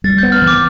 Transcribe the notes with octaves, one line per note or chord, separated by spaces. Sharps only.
G3 A6
B3 G6
F6
E3
D6